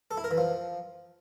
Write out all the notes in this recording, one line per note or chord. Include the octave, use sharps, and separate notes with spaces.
A4
E4
A#4
E3
F3